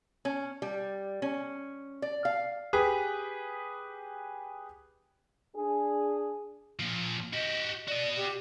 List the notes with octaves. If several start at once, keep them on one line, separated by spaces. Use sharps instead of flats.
C#4
G3
C#4
D5
F5
G4 G#4 B4
D4 G#4
A#2 F3
F#4 G4 D#5
F#4 D5 D#5
G4